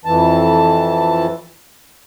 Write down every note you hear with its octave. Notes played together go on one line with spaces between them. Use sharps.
F2 E3 A5